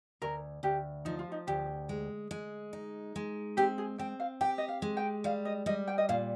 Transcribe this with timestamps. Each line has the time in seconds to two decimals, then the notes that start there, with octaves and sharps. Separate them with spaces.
0.22 D2 A#4
0.63 D2 G4
1.05 F3 D#4
1.19 F4
1.32 D#4
1.47 D2 G4
1.89 G#3
2.31 G#3
2.73 D#4
3.16 G#3
3.57 C4 G4
3.78 G#4
3.98 C4 G5
4.20 F5
4.41 G4 G5
4.58 D#5
4.68 F5
4.82 G#3
4.97 G5
5.24 G3 F5
5.45 D#5
5.66 G3 D#5
5.87 G5
5.98 D#5
6.09 A#2 F5